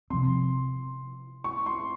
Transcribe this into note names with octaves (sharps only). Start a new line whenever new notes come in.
C3 F3 C4 C6
C#6
C6